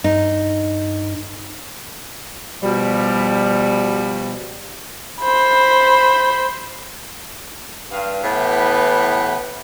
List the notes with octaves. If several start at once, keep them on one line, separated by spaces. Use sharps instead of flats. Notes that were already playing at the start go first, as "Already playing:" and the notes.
G2 D#4
B2 F3 G3
C5 B5
G2 F5
A2 E3 B3 G4 B4